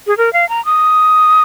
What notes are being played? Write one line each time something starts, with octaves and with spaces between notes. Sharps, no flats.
G#4
A#4
F5
A#5
D#6